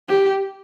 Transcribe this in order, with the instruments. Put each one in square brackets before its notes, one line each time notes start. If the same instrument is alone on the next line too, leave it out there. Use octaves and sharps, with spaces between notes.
[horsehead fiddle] G4